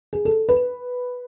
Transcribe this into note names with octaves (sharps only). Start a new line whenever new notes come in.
G#4
A4
B4